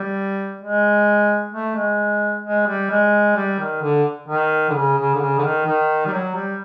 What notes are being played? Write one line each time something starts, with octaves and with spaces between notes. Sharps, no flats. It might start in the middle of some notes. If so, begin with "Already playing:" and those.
Already playing: G3
G#3
A3
G#3
G#3
G3
G#3
G3
D#3
D3
D#3
D3
C#3
C#3
D3
C#3
D3
D#3
D#3
G3
F#3
G3